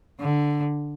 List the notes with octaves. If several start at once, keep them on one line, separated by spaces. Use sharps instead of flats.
D3